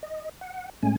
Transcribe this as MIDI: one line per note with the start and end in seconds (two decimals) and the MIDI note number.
0.03 0.29 75
0.41 0.70 78
0.83 0.96 45
0.83 0.96 56
0.83 0.96 57
0.83 0.96 61
0.83 0.96 80